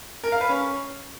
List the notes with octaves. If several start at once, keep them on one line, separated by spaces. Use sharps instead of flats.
A#4
F5
B4
C#4